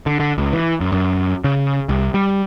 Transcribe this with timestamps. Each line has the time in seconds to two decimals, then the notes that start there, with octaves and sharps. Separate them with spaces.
0.06 D3
0.20 D3
0.38 C#2
0.53 E3
0.80 F#2
0.92 F#2
1.44 C#3
1.89 C2
2.14 G3